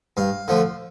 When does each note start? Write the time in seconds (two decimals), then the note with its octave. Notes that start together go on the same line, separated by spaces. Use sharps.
0.17 G2 F5
0.48 D3 F3 A3